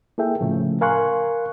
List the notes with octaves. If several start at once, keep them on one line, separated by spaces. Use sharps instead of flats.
A#3 E4 G#4 A4 E5 G5
A2 C#3 F3 A3
A#4 F5 G#5 C6 C#6 F#6